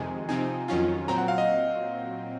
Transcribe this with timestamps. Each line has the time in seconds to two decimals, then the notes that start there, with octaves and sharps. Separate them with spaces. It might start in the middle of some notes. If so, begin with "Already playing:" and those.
Already playing: F2 C3 D#3 G#3 G#5
0.29 C3 F3 C4 D#4 G#5
0.68 F2 D#3 F#3 C#4 F4
1.08 A#2 F#3 C4 A#5
1.18 F#5
1.28 F5
1.38 D#5